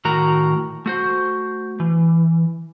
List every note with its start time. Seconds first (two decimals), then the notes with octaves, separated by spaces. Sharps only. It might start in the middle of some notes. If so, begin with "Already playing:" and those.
0.05 A2 D#3 F#4 A#4 A#5
0.86 A3 F#4 C5
1.80 E3